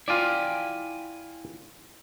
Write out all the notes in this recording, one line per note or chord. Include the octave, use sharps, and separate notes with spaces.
E4 F4 D5 G5 G#5